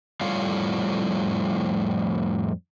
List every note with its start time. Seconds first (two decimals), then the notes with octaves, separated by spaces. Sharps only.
0.21 F2 A2 G3 F4 C#5 F5